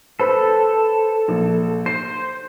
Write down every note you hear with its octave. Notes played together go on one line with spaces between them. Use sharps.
A4 B4 C5 B5
A#1
C5 C7